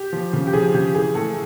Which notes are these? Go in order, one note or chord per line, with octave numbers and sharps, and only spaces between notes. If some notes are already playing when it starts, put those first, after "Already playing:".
Already playing: G4
F3
C#3
G4
F3 G#4
C#3 G4
E3 G#4
A2 A4